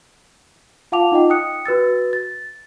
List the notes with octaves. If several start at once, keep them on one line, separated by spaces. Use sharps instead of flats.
F4 F5 F#5 A5 D6 F7
D#4 F4 D#5 G5
G5 D#6 F#6 C#7
F#4 B4 E6 A6
A6